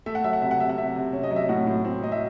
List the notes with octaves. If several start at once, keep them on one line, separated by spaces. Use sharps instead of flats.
A3 E5
F#5
F#3 E5
F#5
C3 E5
F#5
C3 E5
F#5
C3 E5
C3
C#4
D#5
F#3
E5
A2 F#5
A2
C4
F#3 D#5
E5